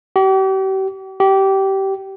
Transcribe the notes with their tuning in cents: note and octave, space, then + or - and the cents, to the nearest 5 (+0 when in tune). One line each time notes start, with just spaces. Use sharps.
G4 -40
G4 -20